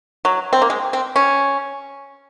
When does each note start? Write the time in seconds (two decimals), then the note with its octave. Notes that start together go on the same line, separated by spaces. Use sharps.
0.25 F#3
0.53 C4
0.62 A#3
0.70 G#3
0.93 C4
1.16 C#4